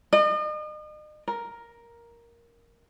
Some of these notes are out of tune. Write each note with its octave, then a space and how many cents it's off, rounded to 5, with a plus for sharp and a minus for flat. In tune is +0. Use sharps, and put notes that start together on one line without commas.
D#5 -40
A#4 +5